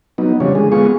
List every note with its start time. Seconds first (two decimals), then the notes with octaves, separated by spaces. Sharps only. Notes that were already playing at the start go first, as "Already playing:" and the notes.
0.18 F#3 B3 D#4
0.40 C#3 F3 G3 D4 C#5
0.55 D3 G#3 G#4
0.72 G#3 B3 F4 G#4 C#6